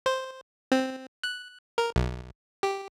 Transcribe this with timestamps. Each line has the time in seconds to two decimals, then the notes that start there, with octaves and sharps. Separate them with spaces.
0.06 C5
0.72 C4
1.23 F#6
1.78 A#4
1.96 B1
2.63 G4